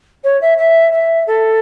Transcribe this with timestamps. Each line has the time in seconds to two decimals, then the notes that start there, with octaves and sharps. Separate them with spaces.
0.24 C#5
0.41 E5
0.58 E5
0.92 E5
1.27 A4